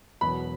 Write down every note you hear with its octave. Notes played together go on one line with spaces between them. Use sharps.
E1 E2 B2 F#3 B5